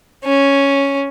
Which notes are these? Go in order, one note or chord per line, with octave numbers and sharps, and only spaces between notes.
C#4